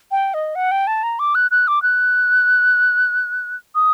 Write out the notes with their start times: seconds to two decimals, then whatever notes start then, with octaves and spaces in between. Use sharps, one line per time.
0.11 G5
0.34 D#5
0.55 F#5
0.71 G5
0.87 A5
1.03 A#5
1.19 D6
1.35 F#6
1.51 F#6
1.68 D6
1.83 F#6
3.75 D#6